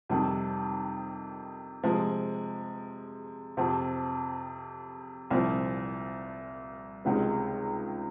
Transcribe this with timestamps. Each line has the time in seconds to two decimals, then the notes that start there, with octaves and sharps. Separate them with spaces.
0.10 F2 C3 D#3 G3
1.84 C3 F3 G#3
3.57 F2 C3 F3 C4
5.31 C2 A#2 F3 C4
7.05 C#2 C3 D#3 G#3